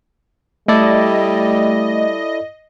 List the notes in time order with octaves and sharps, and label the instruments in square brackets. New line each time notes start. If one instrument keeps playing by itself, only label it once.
[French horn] G3 [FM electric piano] A3 [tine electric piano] E4 A4 D5 [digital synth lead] D#5